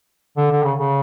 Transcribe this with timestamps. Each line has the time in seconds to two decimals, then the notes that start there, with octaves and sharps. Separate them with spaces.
0.37 D3
0.51 D3
0.64 C#3
0.78 C#3